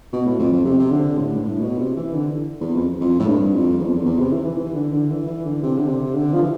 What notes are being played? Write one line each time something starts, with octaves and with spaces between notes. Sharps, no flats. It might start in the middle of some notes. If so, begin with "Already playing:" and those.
B2
A2
F2
F2
C3
C3
D3
A2
G2
A2
B2
C3
E3
D3
E2
F2
F2
A2
G2
F2
E2
F2
E2
E2
C3
E3
E3
E3
D3
D3
E3
E3
D3
C3
D3
C3
D3
F3
E3